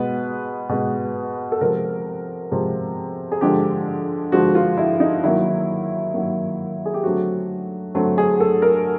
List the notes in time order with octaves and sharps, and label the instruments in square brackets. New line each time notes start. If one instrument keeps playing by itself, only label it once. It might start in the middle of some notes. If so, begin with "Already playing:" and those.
Already playing: [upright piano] B2 G#3 B3 B4
B2 G#3 B3
A4
C3 F3 G#3 A#4
C3 F3 G#3
G#4
D3 F3 G#3 G4
D3 F3 G#3 F#4
F4
E4
D#4
D#3 F#3 A#3 E4
D#3 F#3 A#3
G#4
G4
D3 F#3 A3 C4 F#4
D3 F#3 A3 C4
G#4
A4
A#4